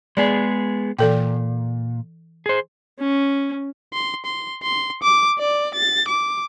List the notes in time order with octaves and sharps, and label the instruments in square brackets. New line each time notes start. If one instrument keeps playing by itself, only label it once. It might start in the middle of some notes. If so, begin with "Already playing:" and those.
[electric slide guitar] G#3 B3 G#4 [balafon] D5
[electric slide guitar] A#2 [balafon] E3 A4 G5
[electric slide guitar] G#4 C5
[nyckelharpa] C#4
[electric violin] C6
C6
C6
D6
D5
A6
D6